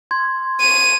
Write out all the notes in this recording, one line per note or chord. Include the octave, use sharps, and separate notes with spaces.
C6 G#6
D#7